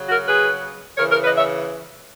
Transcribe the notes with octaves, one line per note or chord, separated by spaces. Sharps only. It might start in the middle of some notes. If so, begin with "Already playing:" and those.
Already playing: C#3 F#3
F#4 A#4
G#4 B4
C#3 E3 A#4 C#5
A#4 C#5
B4 D#5
C#5 E5